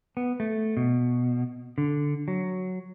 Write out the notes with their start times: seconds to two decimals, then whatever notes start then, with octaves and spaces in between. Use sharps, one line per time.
0.17 B3
0.40 A3
0.77 B2
1.78 D3
2.28 F#3